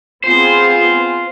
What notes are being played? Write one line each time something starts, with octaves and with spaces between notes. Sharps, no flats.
B3 C4 F4 G#4 C5